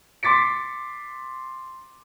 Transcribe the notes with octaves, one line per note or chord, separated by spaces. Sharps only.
C6 D6 A6 B6 C#7